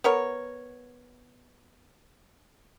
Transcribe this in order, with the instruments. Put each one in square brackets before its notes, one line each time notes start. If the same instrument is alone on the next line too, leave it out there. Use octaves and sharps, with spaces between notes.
[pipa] B3 A#4 C#5